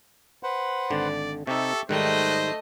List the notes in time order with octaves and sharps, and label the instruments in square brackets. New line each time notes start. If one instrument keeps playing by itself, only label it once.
[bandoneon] B4 C5 F#5
[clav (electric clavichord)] G#1 D3 [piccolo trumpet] D5
[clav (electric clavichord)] C3 D#4 [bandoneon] G4 E5 C#6 [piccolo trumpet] A4
[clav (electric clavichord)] G#2 D#3 G3 [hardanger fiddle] A3 D#5 [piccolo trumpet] C5 [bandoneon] F#6